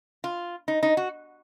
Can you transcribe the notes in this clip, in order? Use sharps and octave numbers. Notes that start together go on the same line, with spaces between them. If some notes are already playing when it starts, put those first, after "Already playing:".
F4
D#4
D#4
F#4